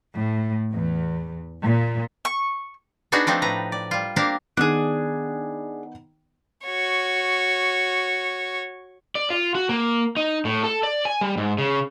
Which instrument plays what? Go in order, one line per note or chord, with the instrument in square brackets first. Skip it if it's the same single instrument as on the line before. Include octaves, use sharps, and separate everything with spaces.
[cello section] A2
E2
A#2
[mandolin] C#6
[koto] B3 D4 D#4 F#4 G#4
F3 A3 C4 D4 D#4
A2 B4 A#5
D5
G3 F4
A#3 C4 D4 G4 A#4 F5
[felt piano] D#3 B3 [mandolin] D4 G#4
[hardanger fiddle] F#4 C#5
[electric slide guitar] D5
F4
F#4
A#3
D#4
A2
A4
D5
G#5
G3
G#2
C#3